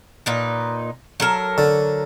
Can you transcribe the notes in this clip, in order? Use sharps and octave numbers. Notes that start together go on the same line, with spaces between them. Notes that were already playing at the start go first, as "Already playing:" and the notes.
A#2 D#4 B4
F#3 A4 A#4
D3